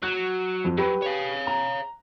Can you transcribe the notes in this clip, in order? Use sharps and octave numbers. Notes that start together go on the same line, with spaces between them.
F#3 F#6
F2
F#3 G4 B4
C#5 F5
A#5